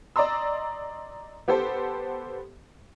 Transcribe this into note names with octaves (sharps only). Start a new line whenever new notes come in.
D5 D#5 A#5 C6 E6
B3 G4 A4 C5